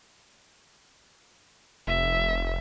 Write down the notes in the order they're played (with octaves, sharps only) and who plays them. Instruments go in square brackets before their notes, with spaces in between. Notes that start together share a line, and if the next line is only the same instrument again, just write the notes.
[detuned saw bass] F1 [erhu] E5